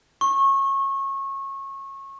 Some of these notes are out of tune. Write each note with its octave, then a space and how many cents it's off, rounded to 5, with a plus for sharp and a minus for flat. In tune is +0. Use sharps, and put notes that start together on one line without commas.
C#6 -25